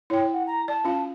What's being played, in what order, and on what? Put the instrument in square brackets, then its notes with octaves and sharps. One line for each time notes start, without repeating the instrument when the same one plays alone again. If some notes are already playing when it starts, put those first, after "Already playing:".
[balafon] E4 G5 [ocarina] C#5
[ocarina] F#5
A#5
[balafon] D5 [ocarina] A5
[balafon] C#4 F4 F5